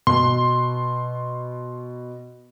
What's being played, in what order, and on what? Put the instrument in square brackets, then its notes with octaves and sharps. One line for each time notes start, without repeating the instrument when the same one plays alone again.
[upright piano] B2 [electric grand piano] C6